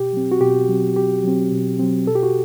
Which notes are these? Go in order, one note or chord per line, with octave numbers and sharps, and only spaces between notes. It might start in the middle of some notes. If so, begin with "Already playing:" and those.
Already playing: B2 G4
F#3 C4
F#4
B2 G4
F#3 C4
B2 G4
F#3 C4
B2
F#3 C4
B2 A4
G4
F#4